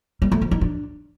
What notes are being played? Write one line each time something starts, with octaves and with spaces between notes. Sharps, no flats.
G3
A3
F3
D#4
D4